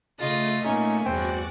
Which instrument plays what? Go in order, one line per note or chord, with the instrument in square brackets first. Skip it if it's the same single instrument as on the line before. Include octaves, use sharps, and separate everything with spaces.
[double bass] C#3 [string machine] A3 [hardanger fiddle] F4 D#5
[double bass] A#2 A#3 [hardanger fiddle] C#4 [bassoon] D#4
[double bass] E2 G2 [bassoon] C4 [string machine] F#4 D5 F#5